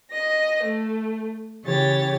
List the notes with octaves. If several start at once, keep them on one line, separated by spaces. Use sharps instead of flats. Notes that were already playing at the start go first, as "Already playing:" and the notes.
D#5 A#6
A3
C#3 E3 G4 C#5 A6